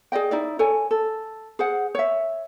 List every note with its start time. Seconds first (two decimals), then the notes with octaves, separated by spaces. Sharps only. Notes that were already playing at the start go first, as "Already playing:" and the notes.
0.12 G#4 D5 D#5 G5
0.31 D#4 E4 D5
0.59 A4 C#5 G#5
0.91 A4
1.59 G#4 C5 F#5
1.95 C#5 E5